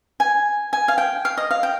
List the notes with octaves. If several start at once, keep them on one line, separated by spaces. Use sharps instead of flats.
G#5
G#5
F5
G5
F5
D#5
F5
G5